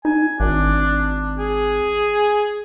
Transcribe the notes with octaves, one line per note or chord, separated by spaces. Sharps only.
D#4 G#5
G#1 D4
G#4